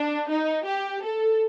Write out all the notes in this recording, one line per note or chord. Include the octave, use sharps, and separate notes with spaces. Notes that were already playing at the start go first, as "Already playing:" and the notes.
Already playing: D4
D#4
G4
A4